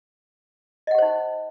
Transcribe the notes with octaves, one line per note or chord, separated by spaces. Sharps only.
D#4 G4 C5 D#5 F#5